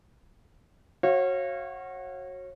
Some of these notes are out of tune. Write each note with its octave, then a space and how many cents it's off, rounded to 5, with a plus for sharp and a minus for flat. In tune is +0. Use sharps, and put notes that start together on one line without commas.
F#4 +0 C#5 -30 F5 -25